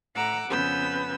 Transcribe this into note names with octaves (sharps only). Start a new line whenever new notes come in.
A2 F#5 A#5 D6 E6
F2 C#3 B3 B4 E6 G6